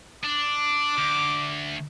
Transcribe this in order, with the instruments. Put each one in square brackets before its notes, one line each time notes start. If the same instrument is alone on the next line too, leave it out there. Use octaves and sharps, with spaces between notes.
[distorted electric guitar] D4 [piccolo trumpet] D6
[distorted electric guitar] D2